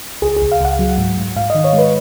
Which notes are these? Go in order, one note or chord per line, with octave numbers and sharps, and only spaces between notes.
C#2 G#4
G#4
C#2
F5
C#2 F#5
F#3
G#2
G#2
G#2 F5
D#3 D#5
C#5
G#3
B4